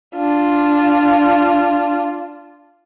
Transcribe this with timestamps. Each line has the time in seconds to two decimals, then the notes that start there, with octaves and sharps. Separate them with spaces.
0.16 D4 F4